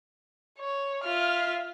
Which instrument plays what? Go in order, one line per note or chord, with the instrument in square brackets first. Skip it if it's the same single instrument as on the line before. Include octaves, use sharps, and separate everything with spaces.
[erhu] C#5
[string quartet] F4 E5 [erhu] F6